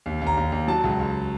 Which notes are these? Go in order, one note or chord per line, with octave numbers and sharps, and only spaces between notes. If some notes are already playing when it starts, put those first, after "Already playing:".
D#2
D#2
A#5
D#2
D#2
F#3 A5
C#2
C#2